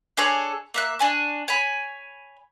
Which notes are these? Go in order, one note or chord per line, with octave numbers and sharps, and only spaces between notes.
D4 G#4 A4 C#5
A#3 E5 F#6
D4 G#5 C#6
C#5 G#5 B5